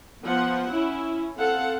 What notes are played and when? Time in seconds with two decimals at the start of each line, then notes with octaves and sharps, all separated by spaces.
0.24 F3 B3 F#5
0.73 C#4 E4
1.36 C4 A4 F5 F#5